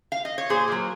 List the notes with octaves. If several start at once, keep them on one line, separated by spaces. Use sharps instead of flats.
F5
D#5
C#5
A#2 G#4 C5
F#3 A#3